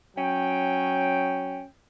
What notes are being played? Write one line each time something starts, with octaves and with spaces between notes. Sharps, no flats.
F#3 C#4 G5